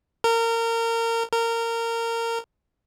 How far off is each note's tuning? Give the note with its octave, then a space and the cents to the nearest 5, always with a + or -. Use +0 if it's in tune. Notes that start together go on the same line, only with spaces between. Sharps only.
A#4 -25
A#4 -20